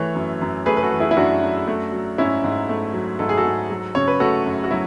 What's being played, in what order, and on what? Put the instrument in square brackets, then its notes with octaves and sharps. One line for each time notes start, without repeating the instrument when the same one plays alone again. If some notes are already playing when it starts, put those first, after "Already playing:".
Already playing: [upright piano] E3 A3 C#5
F#2
F#2
A3 G#4 B4
B4
F#4 A4
E3
E4 G#4
E4
F#2 D4 F#4
F#2
A3
F#3
G#2 C#4 E4
G#2
A3
F#3
G#2 A4
G#4
F#4 A4
G#2
F#3
C#3 C#5
B4
A3 F#4 A4
F#2
F#4
F#3 E4